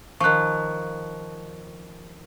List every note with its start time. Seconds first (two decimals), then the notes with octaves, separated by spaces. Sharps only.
0.20 D#3 F3 C#6 F#6